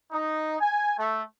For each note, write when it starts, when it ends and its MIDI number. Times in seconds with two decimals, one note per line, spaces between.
0.13 0.55 63
0.61 0.94 80
0.98 1.22 57